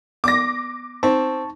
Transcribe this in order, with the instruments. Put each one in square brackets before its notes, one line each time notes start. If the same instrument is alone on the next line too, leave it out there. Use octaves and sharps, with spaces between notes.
[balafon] B3 D5 [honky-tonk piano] D6 A#6
[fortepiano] C4 [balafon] D#4 [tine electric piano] A5 C#6